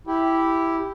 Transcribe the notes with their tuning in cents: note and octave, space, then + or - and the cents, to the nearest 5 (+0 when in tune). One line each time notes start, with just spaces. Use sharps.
E4 +0 G4 +0